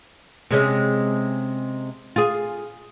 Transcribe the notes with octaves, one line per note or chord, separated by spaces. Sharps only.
C3 G#3 C#4
F4 G#4